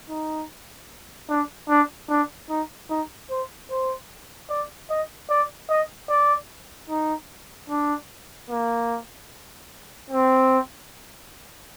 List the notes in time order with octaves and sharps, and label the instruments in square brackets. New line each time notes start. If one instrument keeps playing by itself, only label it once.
[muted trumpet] D#4
D4
D4
D4
D#4
D#4
C5
C5
D5
D#5
D5
D#5
D5
D#4
D4
A#3
C4